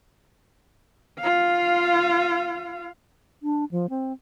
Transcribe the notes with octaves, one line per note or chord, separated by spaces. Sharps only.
F4 F5
D4
F3
C4